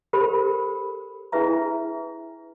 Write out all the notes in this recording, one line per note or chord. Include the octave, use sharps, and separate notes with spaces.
G4 A4 A#4 C5 B5
D4 E4 G#4 B4 E5 A#5